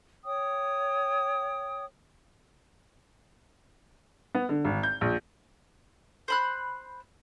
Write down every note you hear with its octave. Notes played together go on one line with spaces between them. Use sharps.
C#5 G5 D#6
B3
D3
G#1
G6
A#1
C5 B5 F#6